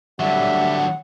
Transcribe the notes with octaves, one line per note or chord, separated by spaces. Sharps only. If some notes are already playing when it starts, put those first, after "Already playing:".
D3 F#3 G3 E5 F#5